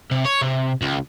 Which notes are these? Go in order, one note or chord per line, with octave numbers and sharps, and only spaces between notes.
C3
C#5
C3
C#2